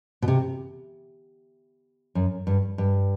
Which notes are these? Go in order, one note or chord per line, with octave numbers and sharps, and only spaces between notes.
B2
C3
F#2
G2
G2